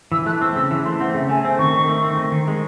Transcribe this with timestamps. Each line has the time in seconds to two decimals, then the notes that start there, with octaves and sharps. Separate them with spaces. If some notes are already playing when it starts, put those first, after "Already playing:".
0.12 E3 E6
0.26 A3 F#6
0.41 C4 E6
0.56 C#3 E6
0.71 E3
0.85 A3 C6
1.00 C4 F#5
1.14 C#3 E5
1.29 A3 G#5
1.45 C4
1.59 D#3 C#6
1.73 D#3
1.88 A3
2.03 C4
2.18 D#3
2.32 D#3
2.48 G#3